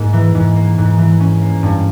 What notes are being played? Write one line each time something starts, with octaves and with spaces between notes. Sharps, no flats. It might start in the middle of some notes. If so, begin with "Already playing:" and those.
Already playing: G#2 A#3
E3
G#2
A#3
G#2
E3
C#4
A#3
G2